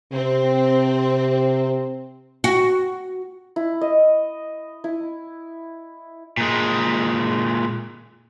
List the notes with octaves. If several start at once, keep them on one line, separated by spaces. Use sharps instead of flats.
C3 C4
F#4
E4
D#5
E4
A#2 G#3